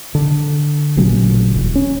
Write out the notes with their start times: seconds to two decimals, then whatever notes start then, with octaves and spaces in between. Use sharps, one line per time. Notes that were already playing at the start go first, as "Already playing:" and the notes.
0.15 D3
0.96 A1 A#2 C#3 F#3
1.55 D#1
1.75 C#4